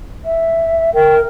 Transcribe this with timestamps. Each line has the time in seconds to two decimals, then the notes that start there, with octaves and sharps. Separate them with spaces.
0.25 E5
0.95 A#4 G5